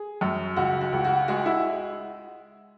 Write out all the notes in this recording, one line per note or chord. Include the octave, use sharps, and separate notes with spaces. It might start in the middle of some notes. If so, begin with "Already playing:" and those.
Already playing: G#4
F#2
C#2 F#4
F#4
C#2
F#4
G#3 F#4
E4